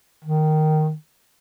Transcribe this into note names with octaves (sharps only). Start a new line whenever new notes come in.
D#3